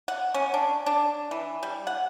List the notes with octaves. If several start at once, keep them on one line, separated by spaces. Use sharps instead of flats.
F#5
C#4
D4
D4
E3
G3
F#5